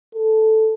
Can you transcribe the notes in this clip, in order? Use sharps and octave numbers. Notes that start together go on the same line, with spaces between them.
A4